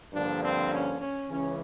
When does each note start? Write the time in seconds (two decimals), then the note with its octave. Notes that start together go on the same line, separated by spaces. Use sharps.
0.13 G2 D3 F3 A#3 D4
0.42 C4
0.71 C#4
1.00 C#4
1.29 C#2 C#3 E3 C#4